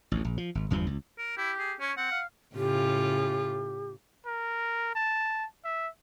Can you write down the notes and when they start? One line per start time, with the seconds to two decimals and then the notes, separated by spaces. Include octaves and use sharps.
0.12 A1 D2
0.25 A#1
0.38 F3
0.55 G#1
0.70 G1 E2 G2 F3
0.87 C#2
1.18 A#4
1.37 E4 G4
1.59 G#4
1.80 C#4 C#5
1.97 C4 F#5
2.11 F5
2.55 A2 C#3 F4 G4
4.26 A#4
4.95 A5
5.65 E5